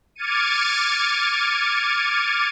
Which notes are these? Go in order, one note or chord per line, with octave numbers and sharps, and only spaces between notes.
D6 F6 G#6 A6 C#7 D#7